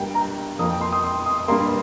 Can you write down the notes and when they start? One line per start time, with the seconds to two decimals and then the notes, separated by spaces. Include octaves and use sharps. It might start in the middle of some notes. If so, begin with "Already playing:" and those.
Already playing: G2 G3 A#3 G5
0.14 A#5
0.59 F2 F3 A#3 D#6
0.70 G5
0.81 C6
0.92 D#6
1.03 C6
1.26 D#6
1.48 G2 G3 A#3 C6